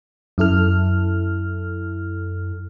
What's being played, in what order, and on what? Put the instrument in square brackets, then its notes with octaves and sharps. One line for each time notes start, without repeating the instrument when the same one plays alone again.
[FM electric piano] F#2 E4 A4 F6